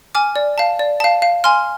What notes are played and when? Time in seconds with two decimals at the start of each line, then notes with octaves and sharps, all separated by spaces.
0.15 G#5 D6 F6
0.36 D5
0.58 F5 A5
0.79 D5
1.00 F5 A5
1.22 F5
1.44 G#5 C6 F6